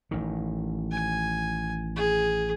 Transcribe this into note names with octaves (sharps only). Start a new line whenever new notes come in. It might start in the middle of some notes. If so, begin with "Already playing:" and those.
A1 D#3
G#5
G#4